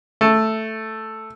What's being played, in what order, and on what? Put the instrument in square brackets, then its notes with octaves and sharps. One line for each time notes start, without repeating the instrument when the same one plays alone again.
[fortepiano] A3